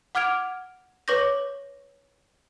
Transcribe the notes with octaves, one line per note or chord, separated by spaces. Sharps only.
F#5 D6 F6 G#6 D7 F7
B4 C#5 C#6 D6 G6 A#6